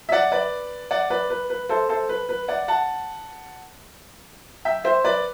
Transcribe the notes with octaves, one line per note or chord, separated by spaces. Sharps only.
E5
D5 F#5
B4 D5
D5 F#5
B4 D5
B4
B4
A4 C5
A4 C5
B4
B4
D5 F#5
F#5 A5
E5 G5
C5 E5
B4 D5